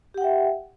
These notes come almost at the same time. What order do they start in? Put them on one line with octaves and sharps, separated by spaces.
G4 F#5 G5 E5